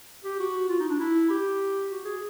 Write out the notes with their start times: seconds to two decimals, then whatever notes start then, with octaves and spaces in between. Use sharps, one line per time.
0.24 G4
0.39 F#4
0.69 F4
0.80 D#4
0.90 D4
1.00 E4
1.30 G4
1.90 F#4
2.05 G#4